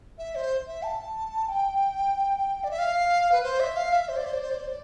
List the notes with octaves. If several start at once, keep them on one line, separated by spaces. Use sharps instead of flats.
E5
C5
E5
A5
G5
D5
E5
F5
B4
C5
E5
F5
E5
C5
D5
C5
D5
C5
D5
C5
D5